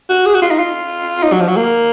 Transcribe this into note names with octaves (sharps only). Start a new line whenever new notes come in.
F#4
G#4
F#4
F4
D#4
F4
D#4
F#3
F3
F#3
A#3